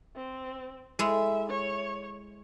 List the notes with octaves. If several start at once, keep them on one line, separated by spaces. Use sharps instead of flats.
C4
G#3 E4 A4 E5
C#5